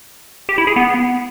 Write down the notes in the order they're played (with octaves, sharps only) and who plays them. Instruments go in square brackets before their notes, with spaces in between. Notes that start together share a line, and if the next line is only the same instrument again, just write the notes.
[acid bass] G4
E4
G#4
B3